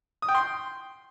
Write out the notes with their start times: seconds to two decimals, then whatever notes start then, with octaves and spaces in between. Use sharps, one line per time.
0.22 D#6
0.28 G5
0.35 C6